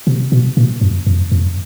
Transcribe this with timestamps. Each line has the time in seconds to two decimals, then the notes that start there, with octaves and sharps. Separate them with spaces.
0.07 C3
0.32 B2
0.57 A#2
0.81 F#2
1.07 F2
1.32 F2